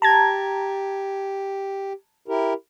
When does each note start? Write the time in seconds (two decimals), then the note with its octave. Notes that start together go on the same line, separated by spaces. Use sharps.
0.02 G4 A5 A#5 G#6
2.28 E4 G4 A#4